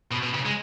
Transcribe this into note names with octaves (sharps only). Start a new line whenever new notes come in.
B2
B2
C#3
G#3